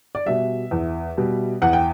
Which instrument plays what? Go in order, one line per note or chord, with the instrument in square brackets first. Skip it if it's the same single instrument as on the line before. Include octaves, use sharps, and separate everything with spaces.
[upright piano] D5
B2 G3 E5
E2
B2 G3
E2 F#5
G5